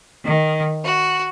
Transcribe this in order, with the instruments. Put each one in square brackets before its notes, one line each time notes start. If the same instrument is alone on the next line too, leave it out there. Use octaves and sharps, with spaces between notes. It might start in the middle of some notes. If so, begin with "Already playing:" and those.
[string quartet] D#3
F#4